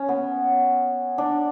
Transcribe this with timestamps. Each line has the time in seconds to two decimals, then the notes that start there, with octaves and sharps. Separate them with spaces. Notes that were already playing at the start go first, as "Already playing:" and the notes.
Already playing: C#4
0.09 B3
1.18 D4